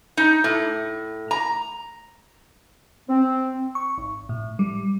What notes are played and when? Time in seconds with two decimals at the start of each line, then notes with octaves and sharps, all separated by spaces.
0.17 D#4
0.44 A2
1.31 A#5
3.09 C4
3.75 C#6
3.98 G#1
4.29 A2
4.59 G3